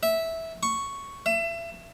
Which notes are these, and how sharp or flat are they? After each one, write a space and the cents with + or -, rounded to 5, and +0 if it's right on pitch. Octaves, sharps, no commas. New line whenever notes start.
E5 -10
C#6 +0
E5 +30